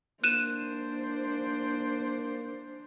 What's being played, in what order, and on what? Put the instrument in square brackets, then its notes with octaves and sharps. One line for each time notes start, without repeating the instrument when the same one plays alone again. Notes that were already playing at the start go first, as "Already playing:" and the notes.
[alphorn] A#3 [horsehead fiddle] D4 C5 [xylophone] F#6 D#7 E7